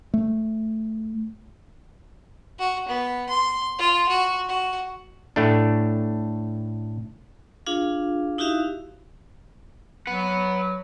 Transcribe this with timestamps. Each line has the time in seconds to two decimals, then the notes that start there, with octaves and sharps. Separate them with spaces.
0.14 A3
2.59 F#4
2.88 B3
3.29 C6
3.79 F4
4.08 F#4
4.48 F#4
5.36 A2 A3 D4
7.66 D4 F4 G#4 F5
8.38 D#4 E4 F#4 G4 E5 F5
10.07 F#3 B4 F#5